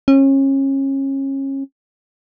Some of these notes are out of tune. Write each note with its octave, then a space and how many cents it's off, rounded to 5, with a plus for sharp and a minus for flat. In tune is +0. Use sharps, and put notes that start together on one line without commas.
C#4 -30